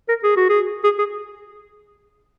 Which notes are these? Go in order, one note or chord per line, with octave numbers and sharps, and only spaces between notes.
A#4
G#4
F#4
G#4
G#4
G#4